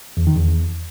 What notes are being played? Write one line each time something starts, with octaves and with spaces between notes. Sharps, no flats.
E2
D#3
E2